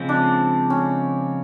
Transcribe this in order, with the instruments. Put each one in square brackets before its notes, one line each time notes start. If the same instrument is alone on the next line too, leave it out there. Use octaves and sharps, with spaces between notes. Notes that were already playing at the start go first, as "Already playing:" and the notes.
Already playing: [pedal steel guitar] C#3 F3 G#3 C4
[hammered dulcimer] D4
C#4